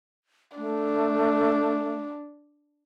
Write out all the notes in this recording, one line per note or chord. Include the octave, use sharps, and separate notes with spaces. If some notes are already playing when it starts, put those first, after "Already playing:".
A3 D4